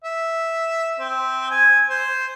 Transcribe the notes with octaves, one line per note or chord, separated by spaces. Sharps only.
E5
C4
G#5
C5